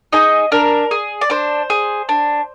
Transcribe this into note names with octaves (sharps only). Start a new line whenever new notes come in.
D#4 G#4 D#5
D4 A#4
G#4
D5
D4 C5
G#4
D4